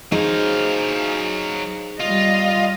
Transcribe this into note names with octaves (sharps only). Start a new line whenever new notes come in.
F#3 D#4 G#4 C5 F5
G3 F4 D#5